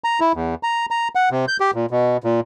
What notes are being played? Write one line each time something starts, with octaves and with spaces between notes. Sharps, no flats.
A#5
E4
E2
A#5
A#5
F#5
C3
G6
G4
A#2
B2
A#2